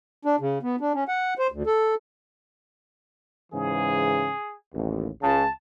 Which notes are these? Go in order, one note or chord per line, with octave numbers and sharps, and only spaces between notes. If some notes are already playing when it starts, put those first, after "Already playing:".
D4
C#3
B3
D4
C#4
F#5
C5
D2
A4
G#2 C#3 E3 G#4
A1 D#2
C#2 C#3 A5